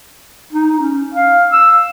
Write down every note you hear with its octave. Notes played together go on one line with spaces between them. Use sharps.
D#4
C#4
F5
E6